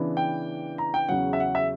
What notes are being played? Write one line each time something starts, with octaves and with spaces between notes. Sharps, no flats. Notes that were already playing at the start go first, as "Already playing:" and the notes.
Already playing: C#3 E3 B3 D4
G5
A#5
G5
E2 C#3 F#3 C#4 F#5
E5
F#5
E5